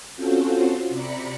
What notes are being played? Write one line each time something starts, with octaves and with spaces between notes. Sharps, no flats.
C4 C#4 F4 F#4 A4 C5
C3 D5 A#5 B5 C#7